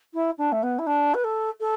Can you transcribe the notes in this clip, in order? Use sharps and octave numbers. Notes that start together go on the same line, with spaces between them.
E4
D4
A3
B3
E4
D4
B4
A4
A4